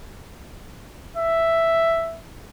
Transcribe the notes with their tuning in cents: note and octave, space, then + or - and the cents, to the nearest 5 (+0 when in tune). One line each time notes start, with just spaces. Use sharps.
E5 +5